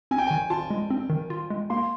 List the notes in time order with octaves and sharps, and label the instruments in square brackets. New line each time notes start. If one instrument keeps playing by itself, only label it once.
[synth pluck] C4 [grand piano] G#5
[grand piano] G5
[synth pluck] D#3 [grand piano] G#5
[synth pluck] F4 [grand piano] A5
[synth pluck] G#3
C4
D#3
F4
G#3
[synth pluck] A#3 [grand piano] C6